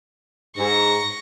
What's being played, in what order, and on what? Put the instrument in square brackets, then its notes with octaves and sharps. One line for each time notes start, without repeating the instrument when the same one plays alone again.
[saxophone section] G#2 [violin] C#6 A#6